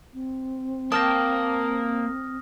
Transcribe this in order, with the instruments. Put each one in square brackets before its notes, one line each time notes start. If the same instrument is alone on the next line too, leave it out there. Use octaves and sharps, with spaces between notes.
[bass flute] C4
[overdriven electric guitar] A#3 [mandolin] G5 A5 [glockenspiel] D#6 F6 A#6